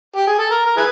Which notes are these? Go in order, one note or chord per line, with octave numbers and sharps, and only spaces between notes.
G4
G#4
A4
A#4
A#4
E4 G#4 B4